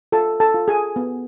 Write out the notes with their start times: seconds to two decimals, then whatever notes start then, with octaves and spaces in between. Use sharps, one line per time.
0.12 F4 A4 A5
0.40 A4 A5
0.54 F4
0.68 G#4 G#5
0.96 B3